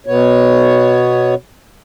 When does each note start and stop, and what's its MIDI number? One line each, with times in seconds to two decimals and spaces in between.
0.06 1.35 47
0.06 1.35 59
0.06 1.35 73